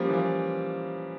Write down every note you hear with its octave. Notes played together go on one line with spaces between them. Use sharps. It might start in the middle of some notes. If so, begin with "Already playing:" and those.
Already playing: F3 G3 A#3 C#4
E3
F3